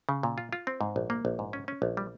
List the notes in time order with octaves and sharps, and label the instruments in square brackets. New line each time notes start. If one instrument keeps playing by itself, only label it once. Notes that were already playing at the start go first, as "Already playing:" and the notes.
[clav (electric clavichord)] C#3
A#2
F4
F4
C4
G#2
A#1
A#3
A#1
G#2
C#4
C#4
A#1
G3